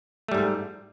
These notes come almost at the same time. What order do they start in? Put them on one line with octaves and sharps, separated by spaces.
A3 G3 G#2